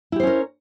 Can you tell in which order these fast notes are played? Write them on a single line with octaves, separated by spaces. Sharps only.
E4 G4 C5 C#4 A#4